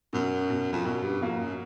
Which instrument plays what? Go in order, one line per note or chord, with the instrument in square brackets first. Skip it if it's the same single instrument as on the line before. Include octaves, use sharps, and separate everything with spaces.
[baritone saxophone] F#2 [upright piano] B2
[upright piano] B2
[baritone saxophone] F2
[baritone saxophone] F#2 [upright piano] B2
[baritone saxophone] G2
[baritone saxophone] F2 [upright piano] A#3
[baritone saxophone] F#2